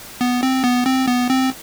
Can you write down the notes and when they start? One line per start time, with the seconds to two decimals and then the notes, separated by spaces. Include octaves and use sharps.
0.21 B3
0.43 C4
0.64 B3
0.86 C4
1.07 B3
1.30 C4